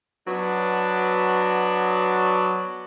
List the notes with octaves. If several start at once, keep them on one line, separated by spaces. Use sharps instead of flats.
F#3 B3 D4